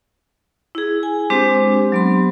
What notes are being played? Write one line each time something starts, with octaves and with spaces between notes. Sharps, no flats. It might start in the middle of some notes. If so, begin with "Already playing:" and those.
E4 G#4
G#5
G#3 C4 D4 G4 C5
F#3 B3 C6